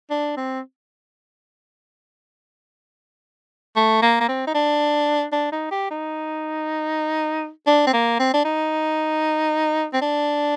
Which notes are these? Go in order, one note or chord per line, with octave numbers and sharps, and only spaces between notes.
D4
C4
A3
A#3
A#3
C4
D#4
D4
D4
D#4
G4
D#4
D4
C4
A#3
C4
D4
D#4
C4
D4